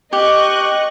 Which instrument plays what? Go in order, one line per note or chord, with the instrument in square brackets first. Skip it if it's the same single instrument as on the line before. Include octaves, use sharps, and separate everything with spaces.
[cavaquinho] G4 [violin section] D#5 C#6 F#6